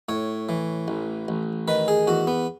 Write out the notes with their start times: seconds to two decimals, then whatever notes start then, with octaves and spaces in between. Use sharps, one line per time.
0.09 A2 C#5
0.49 E3
0.88 A1
1.28 A1
1.68 D#3 B4
1.88 G#4
2.07 E2 F#4
2.27 B3